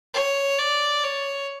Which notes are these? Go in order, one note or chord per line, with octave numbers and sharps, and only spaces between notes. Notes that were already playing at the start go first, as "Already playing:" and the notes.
C#5
D5
C#5